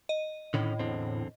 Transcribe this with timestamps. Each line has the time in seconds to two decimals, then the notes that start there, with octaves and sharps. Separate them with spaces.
0.09 D#5
0.54 A2 D3 D#3 C#4
0.79 E2 D3 C4